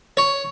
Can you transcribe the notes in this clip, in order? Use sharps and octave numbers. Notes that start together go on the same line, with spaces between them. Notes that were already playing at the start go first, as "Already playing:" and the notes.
C#5